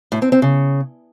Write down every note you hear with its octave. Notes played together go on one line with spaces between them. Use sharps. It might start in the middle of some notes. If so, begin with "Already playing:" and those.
A2
C4
C4
C#3